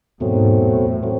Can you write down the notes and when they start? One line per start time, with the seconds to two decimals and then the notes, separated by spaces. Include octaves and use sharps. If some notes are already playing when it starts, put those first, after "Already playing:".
0.20 E2 G#2 B2 F#3 A3 C4
0.61 A2
1.03 F#3 A3 C4